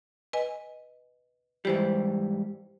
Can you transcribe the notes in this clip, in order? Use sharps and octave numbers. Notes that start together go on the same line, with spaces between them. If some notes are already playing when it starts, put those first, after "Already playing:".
B4 D#5 G#5
G#2 E3 G3 G4 C5